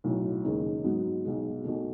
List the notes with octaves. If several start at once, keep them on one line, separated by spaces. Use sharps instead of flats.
B1 A2 F#3
D#2 C#3 G#3 D#4
G#2 F#3 B3 F#4
B1 B2 G#3
B1 B2 A3